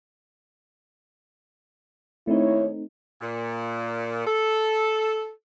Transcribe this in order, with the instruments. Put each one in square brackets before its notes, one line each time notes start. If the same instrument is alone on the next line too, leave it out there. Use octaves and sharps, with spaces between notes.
[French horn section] D#2 C#5 [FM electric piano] A3 C4 D#4 [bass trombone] E4
[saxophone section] A#2
A4